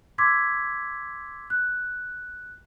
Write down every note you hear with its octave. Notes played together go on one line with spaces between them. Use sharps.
C6 D6 E6 G#6 B6
F#6